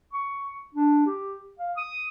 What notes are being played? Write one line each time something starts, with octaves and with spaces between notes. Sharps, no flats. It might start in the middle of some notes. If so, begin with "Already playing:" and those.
C#6
D4
G4
F5
D#6